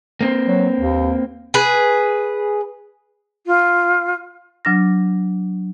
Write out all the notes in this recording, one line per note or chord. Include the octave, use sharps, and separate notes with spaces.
A#3 C4
F#3
D#2
G#4 B4
F4
F#3 D4 F6 A#6